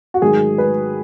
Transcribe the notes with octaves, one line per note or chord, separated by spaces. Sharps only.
F#4
G#2 D#3 F#3 G#4
B4